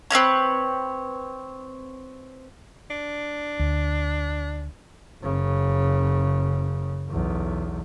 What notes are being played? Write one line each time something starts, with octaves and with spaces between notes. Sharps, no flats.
C4 C#4 B4 C#5
D4
D2
F#1 C#3
B1 E2